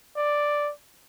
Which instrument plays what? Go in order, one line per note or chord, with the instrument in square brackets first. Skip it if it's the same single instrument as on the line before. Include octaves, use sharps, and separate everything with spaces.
[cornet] D5